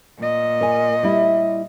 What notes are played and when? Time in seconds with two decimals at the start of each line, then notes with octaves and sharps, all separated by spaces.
0.18 A#2 D#5
0.61 A#4 G#5
1.03 G3 E4